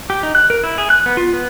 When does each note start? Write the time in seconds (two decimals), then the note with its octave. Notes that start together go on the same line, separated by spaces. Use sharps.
0.10 G4
0.23 D#4
0.35 F#6
0.50 A#4
0.64 E4
0.78 G#4
0.90 F#6
1.06 B3
1.17 F4
1.33 B3